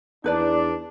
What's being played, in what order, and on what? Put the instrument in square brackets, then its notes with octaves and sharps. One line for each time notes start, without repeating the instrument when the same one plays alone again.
[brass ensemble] E2 D4 [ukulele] D#4 B4 D5